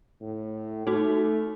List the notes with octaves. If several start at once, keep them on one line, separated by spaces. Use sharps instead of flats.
A2
A3 D#4 F#4